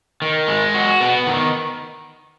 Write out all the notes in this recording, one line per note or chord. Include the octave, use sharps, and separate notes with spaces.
D#3
G#3
F#4
B3
D#3